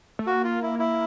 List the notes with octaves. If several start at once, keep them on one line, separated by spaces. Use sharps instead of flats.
A3
A#3 F#4
F4
E4
E4